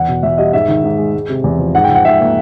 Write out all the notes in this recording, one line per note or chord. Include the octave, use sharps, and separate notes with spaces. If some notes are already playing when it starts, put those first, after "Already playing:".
Already playing: E2 F#5
B2
E2 E5
G3 D#5
G#2 E5
D#3
G#2
G#3
G#3
C3
E2
F3
G#2 F#5
G5
F3
F#5
G#2 E5
A#3